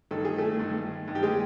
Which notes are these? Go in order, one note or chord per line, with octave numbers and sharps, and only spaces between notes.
G2 D#3 A4
G#4
A3 A4
G2 D#3
G2 D#3
G4
G#3 G#4